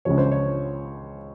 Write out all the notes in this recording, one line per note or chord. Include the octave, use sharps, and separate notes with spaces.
C#2 C#3 F3 C#5
C5
C#5